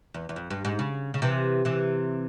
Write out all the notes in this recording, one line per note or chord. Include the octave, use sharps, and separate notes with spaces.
E2
E2
F2
G2
G#2
C#3
C#3
C3 E3
C3 E3